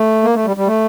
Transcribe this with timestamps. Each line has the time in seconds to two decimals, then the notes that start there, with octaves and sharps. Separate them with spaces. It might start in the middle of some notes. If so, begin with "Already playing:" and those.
Already playing: A3
0.24 A#3
0.35 A3
0.45 G3
0.57 G3
0.67 A3